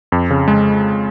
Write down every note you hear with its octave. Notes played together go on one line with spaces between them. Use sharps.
F2
C#3
G#3